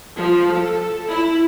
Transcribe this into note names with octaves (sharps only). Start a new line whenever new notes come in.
F3
A4
E4